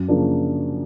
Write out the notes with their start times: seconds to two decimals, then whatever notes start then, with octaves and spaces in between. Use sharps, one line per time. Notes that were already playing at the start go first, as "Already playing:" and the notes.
Already playing: F#2
0.08 C#3 F3 A#3 D4